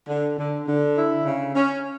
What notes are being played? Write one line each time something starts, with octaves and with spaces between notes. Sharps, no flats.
D3
D3
D3
E4
C#3
C#4